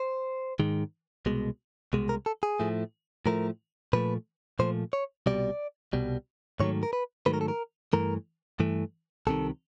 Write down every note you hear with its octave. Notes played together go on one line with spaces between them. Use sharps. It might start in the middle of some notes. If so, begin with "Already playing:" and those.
Already playing: C5
G#2 D#3 G#3
C2 B2 G#3
C2 B2 G#3
A#4
A4
G#4
A2 F3 A3
A2 F3 A3 A#4
A#2 F3 A3 B4
A#2 F3 A3 C5
C#5
C2 B2 G3 D5
C2 B2 G3
G#2 D#3 F#3 A3 C#5
A#4
B4
G#2 D#3 F#3 A3 B4
A#4
A4
A#4
G2 E3 A3 A#4
G2 E3 A3
C2 C3 D#3 A4